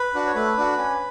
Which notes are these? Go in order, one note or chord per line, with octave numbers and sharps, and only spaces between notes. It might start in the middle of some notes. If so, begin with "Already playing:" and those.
Already playing: B4
D4 F#4
C#5
A3 B4
D4 F#4
C#4